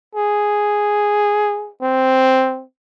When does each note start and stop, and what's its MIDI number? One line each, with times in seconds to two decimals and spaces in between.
0.15 1.70 68
1.82 2.63 60